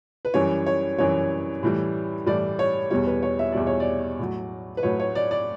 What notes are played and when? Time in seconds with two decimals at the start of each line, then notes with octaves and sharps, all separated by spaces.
0.25 B4
0.34 F#2 E3 G3 C#5
0.66 C#5
0.98 F#2 E3 G3 C#5
1.63 A2 E3 G3
2.26 A2 E3 G3 D5
2.59 C#5
2.91 E2 B2 G3 C#5
3.07 B4
3.23 C#5
3.39 E5
3.52 E2 B2 G3 D5
3.67 C#5
3.80 D5
4.19 A2 F#3
4.77 B4
4.83 A2 F#3 C#5
5.00 C#5
5.15 D5
5.31 D5